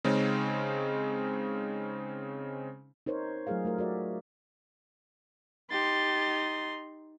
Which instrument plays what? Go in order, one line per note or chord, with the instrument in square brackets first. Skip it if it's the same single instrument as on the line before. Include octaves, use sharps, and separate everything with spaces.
[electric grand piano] C#3 G#3 C4 C#4 D#4
[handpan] D#4 A#4 C5 C#5
F#3 A3 F4 G#4 A#4 F5
A3 F4 A#4
F#4 A#4 D5 E5
[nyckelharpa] D#4 C6 [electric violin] G4 A6